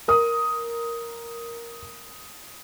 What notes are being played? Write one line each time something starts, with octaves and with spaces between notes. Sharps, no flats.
A#4 D#6